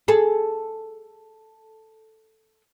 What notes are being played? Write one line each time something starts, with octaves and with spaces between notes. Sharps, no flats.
G#4 A4